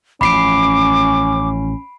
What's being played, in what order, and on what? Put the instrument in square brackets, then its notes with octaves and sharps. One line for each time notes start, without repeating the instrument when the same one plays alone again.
[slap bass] A1 F3 [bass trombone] C#4 [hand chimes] B5 C7 D7 [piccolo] D6